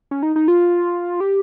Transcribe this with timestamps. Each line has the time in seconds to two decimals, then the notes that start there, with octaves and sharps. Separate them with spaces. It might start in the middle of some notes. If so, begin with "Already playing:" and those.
0.11 C#4
0.23 D#4
0.36 D#4
0.48 F4
1.20 G4